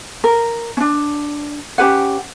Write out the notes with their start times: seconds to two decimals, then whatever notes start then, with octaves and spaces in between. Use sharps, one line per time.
0.24 A#4
0.77 C#4 D4
1.78 C#4 G4 B4 F#5